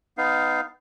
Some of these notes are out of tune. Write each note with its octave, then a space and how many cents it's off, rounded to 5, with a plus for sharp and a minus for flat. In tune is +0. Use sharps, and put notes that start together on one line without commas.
B3 +25 D#4 +0 F5 +0